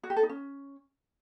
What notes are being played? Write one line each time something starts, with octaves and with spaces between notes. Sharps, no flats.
F#4
G4
A4
D#4
C#4